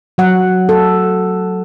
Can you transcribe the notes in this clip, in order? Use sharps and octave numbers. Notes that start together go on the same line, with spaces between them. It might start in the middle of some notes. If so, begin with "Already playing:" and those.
F#3 F#5
A4